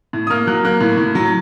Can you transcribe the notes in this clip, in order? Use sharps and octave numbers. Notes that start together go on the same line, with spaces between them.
A2
D#6
A#3 F6
F#3 F#6
A#3 F#6
A2
A2
F#3